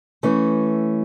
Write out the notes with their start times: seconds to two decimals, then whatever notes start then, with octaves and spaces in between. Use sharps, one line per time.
0.23 E3 A3 C#4